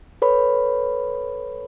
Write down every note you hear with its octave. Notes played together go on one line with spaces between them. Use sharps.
A4 B4 C#5 B5